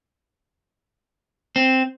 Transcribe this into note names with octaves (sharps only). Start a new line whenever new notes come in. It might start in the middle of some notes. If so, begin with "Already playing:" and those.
C4